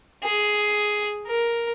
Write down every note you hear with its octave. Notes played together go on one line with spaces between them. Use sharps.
G#4
A#4